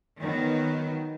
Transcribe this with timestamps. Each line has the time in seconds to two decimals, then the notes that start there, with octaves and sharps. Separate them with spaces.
0.20 D#3 F#3 B3